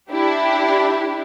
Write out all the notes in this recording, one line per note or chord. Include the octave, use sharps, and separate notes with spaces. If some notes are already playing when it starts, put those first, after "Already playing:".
D4 E4 G4